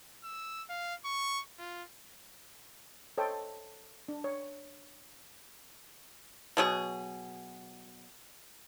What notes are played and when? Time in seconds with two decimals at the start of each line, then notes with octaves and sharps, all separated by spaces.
0.24 E6
0.69 F5
1.05 C#6
1.58 F4
3.18 A4 C5 C#5 D#5 G5
4.08 D4
4.24 C#5
6.57 B2 F#3 G#4